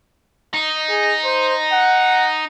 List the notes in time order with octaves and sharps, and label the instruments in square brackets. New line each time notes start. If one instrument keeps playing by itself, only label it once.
[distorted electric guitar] D#4
[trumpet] G#4
C5
F#5